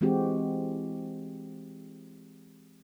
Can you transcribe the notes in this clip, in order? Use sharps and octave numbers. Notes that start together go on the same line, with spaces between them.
E3 G#3 C4 F#4 G4